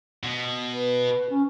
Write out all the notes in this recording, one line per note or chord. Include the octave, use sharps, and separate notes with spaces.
B2
B4
C#4